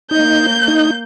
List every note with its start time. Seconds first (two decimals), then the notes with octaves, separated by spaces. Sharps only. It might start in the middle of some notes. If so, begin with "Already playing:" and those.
0.11 A#3 D#4 G6
0.68 D#4